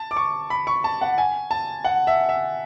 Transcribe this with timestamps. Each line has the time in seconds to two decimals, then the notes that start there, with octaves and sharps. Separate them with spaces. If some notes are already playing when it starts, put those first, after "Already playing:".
Already playing: A5
0.11 D6
0.16 C#6
0.50 B5
0.67 C#6
0.84 A5
1.01 F#5
1.18 G#5
1.51 A5
1.84 F#5
2.07 E5
2.29 E5